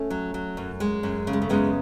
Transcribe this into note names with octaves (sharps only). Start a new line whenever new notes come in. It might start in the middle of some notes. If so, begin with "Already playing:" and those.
Already playing: A3 C#4
F#3
F#3
F#2
G#3
F#2
C#3
G#3
A3
F#2 G#3 B3